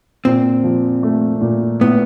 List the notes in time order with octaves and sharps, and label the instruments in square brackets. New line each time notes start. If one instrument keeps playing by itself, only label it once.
[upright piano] A#2 [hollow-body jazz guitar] C4
[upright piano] F3
A3
A#2
[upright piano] A2 [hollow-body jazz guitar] B3